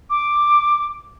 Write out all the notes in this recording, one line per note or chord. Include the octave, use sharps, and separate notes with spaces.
D6